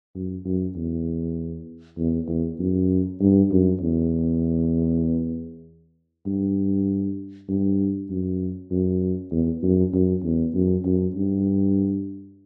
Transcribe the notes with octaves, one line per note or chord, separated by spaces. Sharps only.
F#2
F#2
E2
E2
E2
F#2
G2
F#2
E2
G2
G2
F#2
F#2
E2
F#2
F#2
E2
F#2
F#2
G2